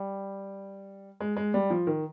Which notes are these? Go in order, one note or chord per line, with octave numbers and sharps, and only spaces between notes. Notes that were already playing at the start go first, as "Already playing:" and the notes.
Already playing: G3
G#3
G#3
G3
F3
D#3